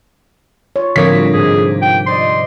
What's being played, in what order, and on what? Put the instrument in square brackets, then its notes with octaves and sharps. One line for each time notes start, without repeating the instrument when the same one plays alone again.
[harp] F4 [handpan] C#5
[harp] A2 D#6 [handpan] D3 F3 C4 [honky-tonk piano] A#3 B6 [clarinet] C#5
[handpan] G3 [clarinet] F#4
[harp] G#2 C3 [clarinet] G#4
[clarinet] G5
[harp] C5 D5 D#5 [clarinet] C6